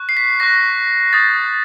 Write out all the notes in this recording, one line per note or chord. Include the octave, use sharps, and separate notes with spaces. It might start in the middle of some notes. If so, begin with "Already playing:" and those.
Already playing: C#6 F#6
C7
B6
C#6 F#6 A#6
D#6 G6 A6